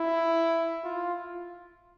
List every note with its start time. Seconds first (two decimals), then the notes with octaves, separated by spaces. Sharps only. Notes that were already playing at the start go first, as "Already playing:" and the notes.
Already playing: E4
0.84 F4